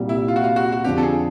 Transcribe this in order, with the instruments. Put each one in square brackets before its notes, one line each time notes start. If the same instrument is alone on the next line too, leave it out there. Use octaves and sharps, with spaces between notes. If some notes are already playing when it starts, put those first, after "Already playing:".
Already playing: [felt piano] C2 A#2 G3
[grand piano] E4
F4
F#4
F4
F#4
F#4
[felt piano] F2 D3 F3 [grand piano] G4
[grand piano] A4
G#4